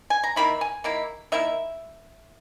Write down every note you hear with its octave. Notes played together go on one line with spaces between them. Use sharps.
G#5
A#5
D#3 A#3 E4 B5
G#5
D#3 A#3 E4
D#3 A#3 E4 E5